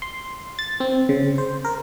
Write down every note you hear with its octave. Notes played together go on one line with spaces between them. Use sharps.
C6
A6
C4
C#3
C5
A#4